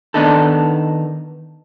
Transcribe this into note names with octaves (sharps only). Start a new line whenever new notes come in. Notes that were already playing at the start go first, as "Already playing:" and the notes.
D#3 B3 D4 D#4 A4